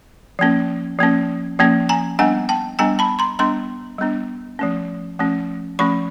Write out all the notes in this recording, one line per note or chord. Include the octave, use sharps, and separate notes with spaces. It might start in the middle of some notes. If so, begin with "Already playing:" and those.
F3 A#3 C#4
F3 A#3 C#4
F3 A#3 C#4
G#5 A#5
G3 B3 D4 F#5 G#5
G5 A5
G3 B3 D4 G#5 A#5
A5 B5
A#5 C6
G3 B3 D4 A#5 C6
G3 B3 D4
F3 A3 C#4
F3 A3 C#4
F3 A3 C#4 B5 C#6